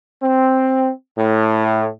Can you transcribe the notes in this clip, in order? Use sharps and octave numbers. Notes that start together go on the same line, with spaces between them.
C4
A2